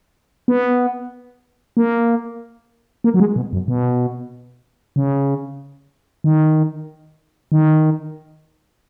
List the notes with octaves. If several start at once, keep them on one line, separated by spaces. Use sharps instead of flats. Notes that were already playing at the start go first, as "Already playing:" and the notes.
B3
A#3
A#3
F#3
G#3
B2
F#2
B2
C#3
D#3
D#3